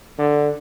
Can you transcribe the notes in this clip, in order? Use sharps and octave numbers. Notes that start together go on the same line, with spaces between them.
D3